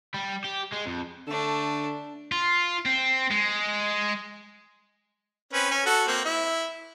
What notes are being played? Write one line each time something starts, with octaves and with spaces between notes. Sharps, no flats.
G3
G4
G#3
F2
D3 A3 D4
F4
C4
G#3
C4 C#4 B4
C#4
F#4 A4
A#3 C4
E4